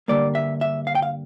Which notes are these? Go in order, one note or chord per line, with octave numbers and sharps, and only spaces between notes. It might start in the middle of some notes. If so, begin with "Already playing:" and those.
G2 D3 G3 A#3 D5
E5
E5
F5
G5
F5